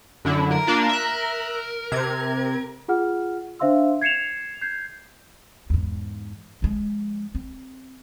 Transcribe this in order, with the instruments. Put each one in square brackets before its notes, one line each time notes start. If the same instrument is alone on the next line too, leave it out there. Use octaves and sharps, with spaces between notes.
[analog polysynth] F#2 D3 E4
[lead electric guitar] A#4
[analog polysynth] A#3 D4 F4
E5 F#6
C3 G#6
[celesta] F4 G#4 F#5 F6
D4 C5 E5 F5 C6 E6
G#6 C7 C#7 E7 F7
G6 G#6 C7
[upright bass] E2 G#2
F3 G#3
C4